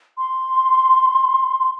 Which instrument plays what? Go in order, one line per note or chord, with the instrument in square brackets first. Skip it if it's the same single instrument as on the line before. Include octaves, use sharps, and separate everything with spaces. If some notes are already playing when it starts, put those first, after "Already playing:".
[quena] C6